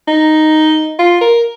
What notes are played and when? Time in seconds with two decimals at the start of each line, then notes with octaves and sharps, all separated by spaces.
0.08 D#4
0.99 F4
1.21 A#4